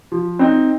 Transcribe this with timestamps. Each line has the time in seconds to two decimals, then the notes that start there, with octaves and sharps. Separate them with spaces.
0.12 F3
0.39 C4 D#4